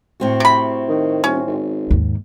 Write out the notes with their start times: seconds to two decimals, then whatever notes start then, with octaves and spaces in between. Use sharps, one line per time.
0.20 A2 C4 F#4
0.40 C3 B5
0.89 D#3
1.24 D#1 C#4
1.47 G#1
1.90 D#2 G#2